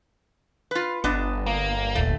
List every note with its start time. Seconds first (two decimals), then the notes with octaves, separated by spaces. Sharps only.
0.71 F4 B4
1.04 G1 B3 D4 D#5
1.46 A#3
1.95 D#1 D#2 A3